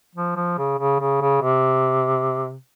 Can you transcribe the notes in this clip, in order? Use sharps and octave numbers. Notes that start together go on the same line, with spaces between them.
F3
F3
C#3
C#3
C#3
C#3
C3